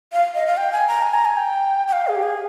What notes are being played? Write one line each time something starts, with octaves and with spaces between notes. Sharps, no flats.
F5
D#5
F5
G5
G#5
A#5
G#5
A#5
G#5
G5
G5
F5
G#4
G4
G#4